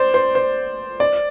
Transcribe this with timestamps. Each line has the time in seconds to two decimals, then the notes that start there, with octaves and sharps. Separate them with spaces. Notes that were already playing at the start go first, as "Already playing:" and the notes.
Already playing: C5 D5
0.14 C5
0.35 C5
1.00 D5